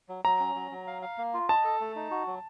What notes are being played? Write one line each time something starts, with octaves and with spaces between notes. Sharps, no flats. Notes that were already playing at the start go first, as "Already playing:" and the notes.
F#3
F#3 A#5
C#4
F#3
F#3
F5
F5
A#3
F4
D#5 A5
A4
A3
D#4
F#4
F#3